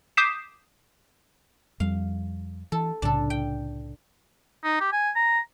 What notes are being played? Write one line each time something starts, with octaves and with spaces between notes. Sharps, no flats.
D6 D#6 G6 B6 C7 E7
F2 G3 F5
E3 A4
C2 A2 C#3 D4 A4
G5
D#4
G4
G#5
A#5